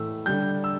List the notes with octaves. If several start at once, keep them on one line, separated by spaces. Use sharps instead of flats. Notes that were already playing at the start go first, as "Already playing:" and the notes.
Already playing: A2 E3 A3 E6
D3 G3 G6
E6